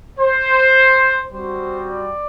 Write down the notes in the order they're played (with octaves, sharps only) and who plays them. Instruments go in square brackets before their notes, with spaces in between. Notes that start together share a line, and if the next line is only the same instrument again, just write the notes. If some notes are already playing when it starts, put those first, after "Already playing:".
[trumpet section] C5
G3 C4 F#4 C5
D5